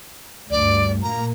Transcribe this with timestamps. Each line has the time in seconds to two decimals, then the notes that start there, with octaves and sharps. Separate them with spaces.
0.50 D2 G2 D5
1.02 A#2 A#3 A#5